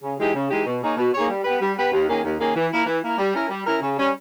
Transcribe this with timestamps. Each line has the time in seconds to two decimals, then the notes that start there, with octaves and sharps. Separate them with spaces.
0.02 C#3
0.19 E3 G#3 D#4 G4
0.34 C#3
0.50 E3 G#3 D#4 G4
0.66 B2
0.81 A#3 D#4 G#4 C#5
0.97 B2
1.13 A#3 D#4 G#4 C#5
1.29 G3
1.44 B3 G4 B4
1.60 G3
1.77 B3 G4 B4
1.92 D#2
2.07 D#3 A#3 C#4 G#4
2.23 D#2
2.39 D#3 A#3 C#4 G#4
2.55 E3
2.71 A#3 E4 A#4
2.86 E3
3.02 A#3 E4 A#4
3.18 G3
3.34 C#4 E4 A#4
3.50 G3
3.66 C#4 E4 A#4
3.81 C#3
3.97 G3 C#4